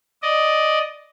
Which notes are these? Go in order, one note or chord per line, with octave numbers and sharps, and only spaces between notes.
D5 D#5